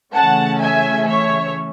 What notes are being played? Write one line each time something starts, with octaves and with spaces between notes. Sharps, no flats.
C#3 E3 A3 C#4 F#5 A5
E5 G#5
C#5 E5